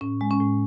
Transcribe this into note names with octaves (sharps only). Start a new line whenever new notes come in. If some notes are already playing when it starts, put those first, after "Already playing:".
A2 C#4
G#3
C#4
A2